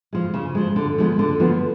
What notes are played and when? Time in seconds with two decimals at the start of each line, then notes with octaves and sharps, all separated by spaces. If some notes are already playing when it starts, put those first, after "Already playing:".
0.13 F3 G#3
0.34 C#3
0.55 F3 G#3
0.76 D3
0.98 F3 G#3 B3
1.19 D3
1.40 F3 G#3 B3